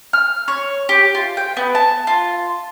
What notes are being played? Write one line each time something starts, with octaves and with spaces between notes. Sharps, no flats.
F6
C#5
G4
F4
G5
B3
A5
F4